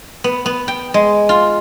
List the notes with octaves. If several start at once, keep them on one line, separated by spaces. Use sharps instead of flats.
B3
B3
G5
G#3
F4